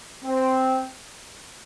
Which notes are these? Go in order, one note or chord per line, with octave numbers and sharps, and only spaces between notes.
C4